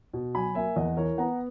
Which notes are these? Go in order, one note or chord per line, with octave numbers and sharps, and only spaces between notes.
B2
F#3 G#5 B5
A#3 E5 G#5
E2 D#5 F#5
E3 A#4 C#5
B3 F#5 A#5